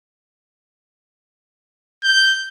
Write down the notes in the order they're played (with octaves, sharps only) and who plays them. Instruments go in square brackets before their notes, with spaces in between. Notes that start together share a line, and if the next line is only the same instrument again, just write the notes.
[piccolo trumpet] G6